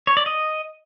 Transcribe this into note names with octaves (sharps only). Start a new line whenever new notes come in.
C#5
D5
D#5